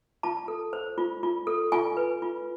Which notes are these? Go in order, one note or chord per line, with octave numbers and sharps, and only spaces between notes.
F4 A5
A4
C5
F4
F4
A4
F4 G#5
B4
F4